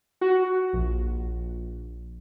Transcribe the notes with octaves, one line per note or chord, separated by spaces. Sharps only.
F#4
A#1